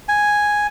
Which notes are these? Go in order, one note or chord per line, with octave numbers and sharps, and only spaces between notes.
G#5